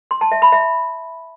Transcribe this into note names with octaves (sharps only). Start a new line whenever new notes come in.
C6
A5
E5
B5
E5